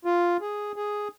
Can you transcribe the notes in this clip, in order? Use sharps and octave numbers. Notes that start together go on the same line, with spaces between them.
F4
G#4
G#4